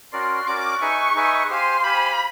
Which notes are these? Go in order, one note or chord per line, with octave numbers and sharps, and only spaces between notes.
C#4 F#4 A#4 D5 C6
C#4 F#4 A#4 D5 D6
D#4 G#4 B4 E5 G#5 C#6
D#4 G#4 B4 E5 G#5
G4 C5 F5 G#5 C6
G4 C5 F5 G#5 B5